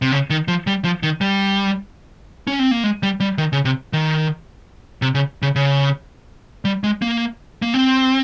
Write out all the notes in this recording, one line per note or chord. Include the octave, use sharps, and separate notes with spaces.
C3
C#3
D#3
F3
G3
F3
D#3
G3
C#4
C4
A#3
G#3
G3
G3
D#3
C#3
C3
D#3
C3
C#3
C#3
C#3
G3
G#3
A#3
A#3
C4